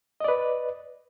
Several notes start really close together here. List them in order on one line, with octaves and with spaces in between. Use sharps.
D#5 D5 B4